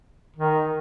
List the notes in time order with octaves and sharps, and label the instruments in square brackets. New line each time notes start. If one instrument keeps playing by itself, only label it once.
[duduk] D#3